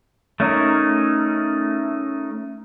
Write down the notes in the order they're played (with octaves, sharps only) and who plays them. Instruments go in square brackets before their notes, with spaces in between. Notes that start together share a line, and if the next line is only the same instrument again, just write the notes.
[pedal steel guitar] A3 C#4 D#4 A#4